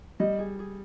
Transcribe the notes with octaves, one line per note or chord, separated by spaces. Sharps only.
G3 D#5
G#4
G#4